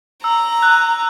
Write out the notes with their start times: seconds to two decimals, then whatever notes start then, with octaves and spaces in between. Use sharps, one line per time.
0.24 A#5 E6
0.63 F#6